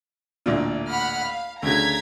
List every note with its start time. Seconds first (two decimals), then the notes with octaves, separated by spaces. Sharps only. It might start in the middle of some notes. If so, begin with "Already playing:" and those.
0.46 A1 D2 A#2
0.89 F#5 B5 F6
1.27 F5
1.62 D2 C#3 A#5 G#6 B6